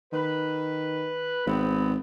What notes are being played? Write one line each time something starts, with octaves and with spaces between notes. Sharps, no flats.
D#3 B4
G#1 G#3 B3 C4